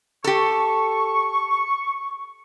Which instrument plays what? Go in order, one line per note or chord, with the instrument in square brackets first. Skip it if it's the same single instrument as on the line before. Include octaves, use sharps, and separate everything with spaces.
[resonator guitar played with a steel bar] G4 A4 [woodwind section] C#6